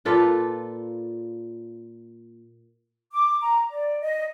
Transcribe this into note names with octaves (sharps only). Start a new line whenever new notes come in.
A#2 F4 A4 B4
D6
A#5
D5
D#5